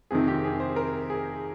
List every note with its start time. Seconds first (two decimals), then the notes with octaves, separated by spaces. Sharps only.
0.11 F2 C3 D#3 G#4
0.28 G4
0.44 G#4
0.60 C5
0.76 A#4
1.10 G#4